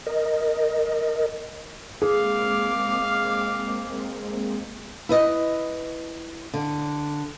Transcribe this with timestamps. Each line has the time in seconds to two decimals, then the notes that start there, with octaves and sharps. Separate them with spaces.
0.06 A#4 D#5
2.02 G#3 A#3 C4 G#4 F5 D6
5.09 E4 B4 D#5
6.53 D3